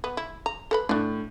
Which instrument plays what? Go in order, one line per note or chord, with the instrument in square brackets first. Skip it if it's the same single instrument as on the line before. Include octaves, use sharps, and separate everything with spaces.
[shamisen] B3
E4
A#5
A4 B4 B5
[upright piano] A2 [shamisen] D4 D5